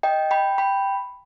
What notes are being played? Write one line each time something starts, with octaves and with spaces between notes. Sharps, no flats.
D#5 G5
G5 B5
G5 B5